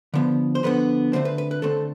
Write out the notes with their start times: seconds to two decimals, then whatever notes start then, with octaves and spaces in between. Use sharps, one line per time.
0.14 D3 F3 B3
0.55 C5
0.63 D3 F3 B3 B4
1.13 D3 A3 C4 C5
1.25 B4
1.38 B4
1.51 B4
1.62 D3 A3 C4 A4